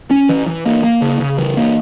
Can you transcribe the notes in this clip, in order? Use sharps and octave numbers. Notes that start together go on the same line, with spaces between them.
C#4
E3
E3
A#3
A#3
C#3
C#3
E3
A#3